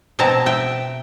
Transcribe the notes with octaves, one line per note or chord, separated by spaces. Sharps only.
B2 C4 A5 A#5
E5 G5